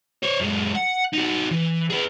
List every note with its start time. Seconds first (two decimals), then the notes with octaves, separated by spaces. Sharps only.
0.23 C5 C#5
0.40 F#2 G#3
0.75 F#5
1.14 D#4 F#4
1.51 E3
1.90 G#4 B4